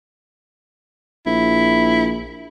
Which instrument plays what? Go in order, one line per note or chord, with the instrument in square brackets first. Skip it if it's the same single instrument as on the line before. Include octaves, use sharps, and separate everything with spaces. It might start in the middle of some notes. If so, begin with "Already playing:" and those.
[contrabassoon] A#1 [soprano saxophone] E4